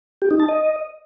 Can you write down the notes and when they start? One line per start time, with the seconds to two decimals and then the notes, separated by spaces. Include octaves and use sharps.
0.22 G4
0.31 D#4
0.40 A5
0.49 D#5